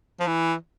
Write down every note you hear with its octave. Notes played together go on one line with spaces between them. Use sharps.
F3
E3